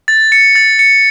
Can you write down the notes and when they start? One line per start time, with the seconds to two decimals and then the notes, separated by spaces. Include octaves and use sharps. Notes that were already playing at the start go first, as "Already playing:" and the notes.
0.08 A6
0.32 C#7
0.55 A6
0.79 C#7